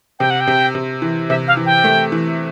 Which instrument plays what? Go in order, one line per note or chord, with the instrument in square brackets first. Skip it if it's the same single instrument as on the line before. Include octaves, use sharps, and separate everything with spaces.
[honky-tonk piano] C3 [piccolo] G5
[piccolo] F#5
G5
[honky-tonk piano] C3
C3
E3
[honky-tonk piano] C3 [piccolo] E5
[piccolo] F5
[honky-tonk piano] E3
[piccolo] G5
[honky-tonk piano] A3
E3